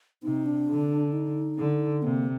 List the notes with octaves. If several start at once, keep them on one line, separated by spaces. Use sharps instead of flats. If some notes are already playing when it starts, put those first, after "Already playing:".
C3 D#4
D4
D3
D#4
D3
C3 A#3